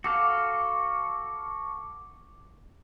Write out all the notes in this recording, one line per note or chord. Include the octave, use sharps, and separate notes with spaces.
F#4 A4 F5 D6